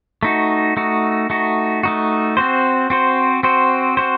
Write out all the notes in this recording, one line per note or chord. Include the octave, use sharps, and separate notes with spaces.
A3 D#4 F#4
A3 D#4 F#4
A3 D#4 F#4
A3 D#4 F#4
C4 F#4 C5
C4 F#4 C5
C4 F#4 C5
C4 F#4 C5